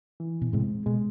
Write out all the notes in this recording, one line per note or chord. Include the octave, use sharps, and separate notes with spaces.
E3
B2
A2 C3 G#3
B2 G#3